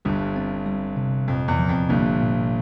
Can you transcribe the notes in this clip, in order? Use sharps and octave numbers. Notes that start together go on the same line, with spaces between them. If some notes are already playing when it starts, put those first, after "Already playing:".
G1 G2 G3
C4
G3
C3
F2 A#2
E2
F3
F2
G1 G2 A#3
A#2